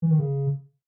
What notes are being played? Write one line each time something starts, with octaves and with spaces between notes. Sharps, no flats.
E3
D#3
C#3